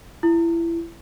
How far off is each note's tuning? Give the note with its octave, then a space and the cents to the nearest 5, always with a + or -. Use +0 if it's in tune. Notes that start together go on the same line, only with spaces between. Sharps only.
E4 +25